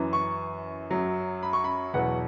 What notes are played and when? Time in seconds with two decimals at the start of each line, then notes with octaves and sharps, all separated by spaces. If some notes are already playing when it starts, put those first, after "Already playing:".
Already playing: F#2 E3
0.13 C#6
0.91 F#2 F#3
1.43 B5
1.53 C#6
1.64 B5
1.94 E2 B2 F#3 F#5